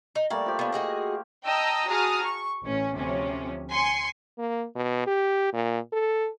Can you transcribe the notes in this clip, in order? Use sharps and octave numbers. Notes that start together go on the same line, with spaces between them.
D#4
G3 A3 A#3 D5
F3 G4
B3 D4
F#4 G#4 D#5
D#5 G5 A5 A#5 E6
F#4 G#4 A5 A#5 D#6 F6
C#6
A1 C#4
D2 C3 F3 C#4
G#5 C6 C7 C#7
A#3
B2
G4
A#2
A4